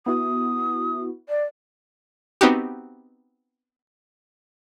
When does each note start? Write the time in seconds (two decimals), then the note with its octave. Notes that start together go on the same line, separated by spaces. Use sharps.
0.06 B3 E4 F#4 D#6
1.29 D5
2.41 B3 C4 D#4 F#4 G4